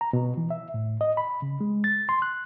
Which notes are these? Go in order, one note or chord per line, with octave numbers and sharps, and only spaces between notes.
A#5
B2
E3
E5
A2
D#5
B5
C#3
G#3
A6
C6
F#6